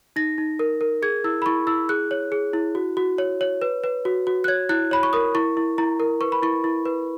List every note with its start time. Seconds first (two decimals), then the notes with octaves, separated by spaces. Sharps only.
0.16 D#4 A#6
0.38 D#4
0.59 A#4
0.81 A#4
1.02 G#4 G#6
1.24 E4 E6
1.42 B5
1.46 E4 C#6
1.67 E4 E6
1.89 G#4 F#6
2.11 C#5
2.32 G#4
2.53 E4
2.75 F#4
2.97 F#4
3.18 C#5
3.41 C#5
3.62 B4
3.84 B4
4.05 F#4
4.27 F#4
4.44 F#6
4.48 C#5 G#6
4.69 E4 F#6
4.91 C#5 B5
5.03 C#6
5.13 A#4 D#6
5.35 E4 C#6
5.57 E4
5.78 E4 A#5
6.00 A#4
6.21 B4 C#6
6.32 B5
6.43 E4 C#6
6.64 E4
6.85 B4